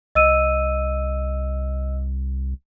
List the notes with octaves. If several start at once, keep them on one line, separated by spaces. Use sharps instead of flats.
C2 D#5 E6 D#7